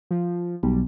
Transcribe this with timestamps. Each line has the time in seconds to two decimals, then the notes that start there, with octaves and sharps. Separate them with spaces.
0.11 F3
0.63 B1 G3